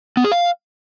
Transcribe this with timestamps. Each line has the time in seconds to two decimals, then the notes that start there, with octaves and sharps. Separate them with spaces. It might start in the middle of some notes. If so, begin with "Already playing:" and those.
0.17 B3
0.24 G#4
0.32 F5